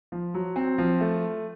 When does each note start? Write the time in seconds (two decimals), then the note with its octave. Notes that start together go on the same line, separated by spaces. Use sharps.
0.12 F3
0.34 F#3
0.56 C4
0.78 F3
1.00 A3